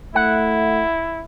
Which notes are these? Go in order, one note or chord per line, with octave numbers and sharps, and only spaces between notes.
A3 E4 F#5